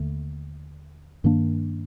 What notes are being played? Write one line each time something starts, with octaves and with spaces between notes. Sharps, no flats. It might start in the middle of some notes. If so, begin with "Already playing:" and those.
Already playing: D#2 D3 A3
G2 D#3 A#3 D4